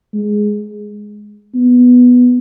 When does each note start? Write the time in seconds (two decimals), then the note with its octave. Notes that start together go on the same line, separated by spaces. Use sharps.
0.14 G#3
1.55 B3